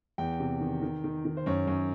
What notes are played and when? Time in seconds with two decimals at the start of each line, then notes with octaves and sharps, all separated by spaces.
0.18 E2 G5
0.40 C3
0.61 D#3
0.82 D#3
1.04 D#3
1.25 D#3
1.37 C5
1.46 F#2 C#5
1.67 F#2